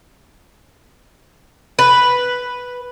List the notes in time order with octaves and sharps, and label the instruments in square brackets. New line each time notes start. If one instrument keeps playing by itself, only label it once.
[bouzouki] B4